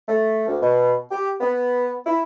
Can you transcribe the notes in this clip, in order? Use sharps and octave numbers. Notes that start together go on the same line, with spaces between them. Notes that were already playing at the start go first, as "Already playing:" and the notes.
A3
D2
B2
G4
B3
E4